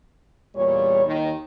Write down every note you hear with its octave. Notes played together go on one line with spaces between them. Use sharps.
E2 A#2 G3 C#5
D#2 D#3